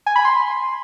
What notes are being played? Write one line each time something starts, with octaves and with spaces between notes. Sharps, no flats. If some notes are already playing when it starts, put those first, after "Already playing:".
G#5
B5
C6